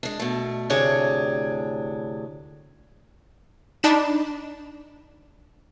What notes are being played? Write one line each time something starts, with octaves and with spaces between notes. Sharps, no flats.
G#3 D4
B2 A3
D2 A2 C3 D4 G#4 C#5
D4 D#4 B5 E7